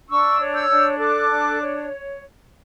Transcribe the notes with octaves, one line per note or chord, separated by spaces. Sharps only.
D4 C#6 E6
C#5
E6 G6
D4
A4 D6 F#6
D4
C#5